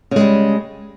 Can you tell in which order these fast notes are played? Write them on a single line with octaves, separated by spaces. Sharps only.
C#3 G#3 G3